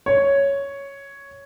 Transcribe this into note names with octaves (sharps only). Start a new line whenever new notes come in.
C#5